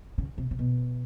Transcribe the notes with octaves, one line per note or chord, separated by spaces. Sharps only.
C#3
C3
C3
B2